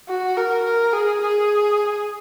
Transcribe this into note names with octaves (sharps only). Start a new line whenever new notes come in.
F#4
A#4
A#4
G#4
G#4